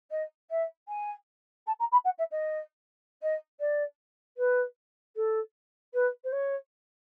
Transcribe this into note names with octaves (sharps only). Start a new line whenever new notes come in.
D#5
E5
G#5
A5
A#5
B5
F#5
E5
D#5
D#5
D5
B4
A4
B4
C5
C#5